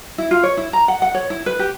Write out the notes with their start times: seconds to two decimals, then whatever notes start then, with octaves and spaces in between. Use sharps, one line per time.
0.18 E4
0.31 F4
0.43 C#5
0.57 E4
0.73 A#5
0.88 F#5
1.02 F#5
1.15 C#5
1.30 E4
1.46 B4
1.59 G4